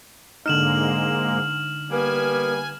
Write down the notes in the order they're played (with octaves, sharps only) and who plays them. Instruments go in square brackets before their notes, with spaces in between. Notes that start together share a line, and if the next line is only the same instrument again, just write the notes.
[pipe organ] G#2 G#3 A#3 [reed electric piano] D3 D#4 [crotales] F6 E7 F#7
[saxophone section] G3 A#3 B3 [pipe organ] G#5